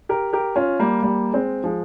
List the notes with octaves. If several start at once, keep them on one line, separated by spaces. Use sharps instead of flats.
G4 A#4
G4 A#4
C#4 F4
G3 A#3
G3 A#3
G#3 C4
F3 G#3